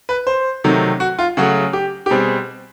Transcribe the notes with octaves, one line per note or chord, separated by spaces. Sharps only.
B4
C5
C3 D#3 F#3 A3
F#4
F4
C#3 F#3 A3 F#4
G4
G4
B2 G3 C4 G#4